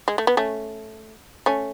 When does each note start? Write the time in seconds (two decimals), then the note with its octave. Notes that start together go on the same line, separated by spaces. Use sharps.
0.08 G#3
0.18 A3
0.27 B3
0.37 A3 C#4
1.46 A3 C#4